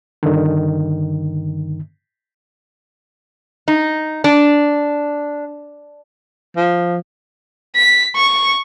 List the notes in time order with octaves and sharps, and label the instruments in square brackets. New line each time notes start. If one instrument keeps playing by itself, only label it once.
[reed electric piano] G2 D3 D#3
[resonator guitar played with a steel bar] D#4
D4
[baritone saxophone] F3
[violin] B6
C#6